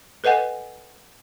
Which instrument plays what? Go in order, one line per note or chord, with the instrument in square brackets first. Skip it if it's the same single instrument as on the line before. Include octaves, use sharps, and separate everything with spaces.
[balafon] A4 B4 D#5 F#5 G#5